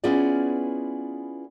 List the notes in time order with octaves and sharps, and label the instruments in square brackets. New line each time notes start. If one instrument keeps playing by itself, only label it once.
[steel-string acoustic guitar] B3 C#4 E4 F4 G#4 D5